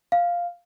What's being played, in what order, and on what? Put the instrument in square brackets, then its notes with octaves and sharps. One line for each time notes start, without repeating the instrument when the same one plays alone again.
[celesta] F5